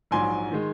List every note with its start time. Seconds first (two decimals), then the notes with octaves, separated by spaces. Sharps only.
0.11 A#1 G#2 F#3 G#5 C6
0.52 D#3 G#3